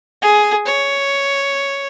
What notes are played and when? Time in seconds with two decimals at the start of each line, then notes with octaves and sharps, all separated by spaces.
0.22 G#4
0.66 C#5